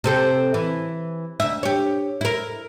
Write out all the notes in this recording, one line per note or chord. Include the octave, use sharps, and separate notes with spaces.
C3 C4 A4
E3
D2 E5
G4 C#5
E4 A#4